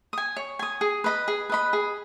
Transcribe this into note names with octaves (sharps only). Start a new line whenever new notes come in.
G#5 D#6
C#5
G#5 D#6
G#4
B4 D#5 B5
G#4
B4 D#5 B5
G#4